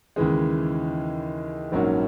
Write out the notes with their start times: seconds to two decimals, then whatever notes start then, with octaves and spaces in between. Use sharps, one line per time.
0.16 D#2 C#3 E3 G#3
1.72 A#1 G#2 F#3 A#3 C#4